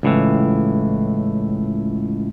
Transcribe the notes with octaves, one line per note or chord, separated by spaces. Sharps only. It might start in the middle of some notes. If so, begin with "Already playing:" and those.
C#2 A2 E3